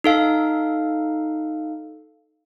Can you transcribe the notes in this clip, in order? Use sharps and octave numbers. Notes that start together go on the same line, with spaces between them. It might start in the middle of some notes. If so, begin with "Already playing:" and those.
D#4 A4 F5